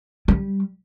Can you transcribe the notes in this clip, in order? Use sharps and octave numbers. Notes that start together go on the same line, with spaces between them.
G3